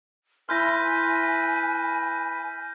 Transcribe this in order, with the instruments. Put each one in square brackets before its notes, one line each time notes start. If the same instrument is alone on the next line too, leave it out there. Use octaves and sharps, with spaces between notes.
[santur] E4 C6 [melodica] B4 [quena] G#5 [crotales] F6 G6 A#6